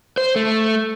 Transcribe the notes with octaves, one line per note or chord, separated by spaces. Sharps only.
C5
A3